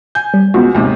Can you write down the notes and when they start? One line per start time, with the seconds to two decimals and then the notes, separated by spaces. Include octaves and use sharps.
0.15 G#5 G6
0.34 G3
0.54 C#2 B3 F4 F#4
0.75 D#2 G#2 C3